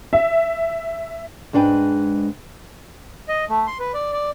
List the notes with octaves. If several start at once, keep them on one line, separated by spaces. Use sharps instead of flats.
E5
G#2 G#3 D4 B4 G5
D#5
A3
C6
B4
D5
D5